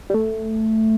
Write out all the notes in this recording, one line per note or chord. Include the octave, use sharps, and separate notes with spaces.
G3
A3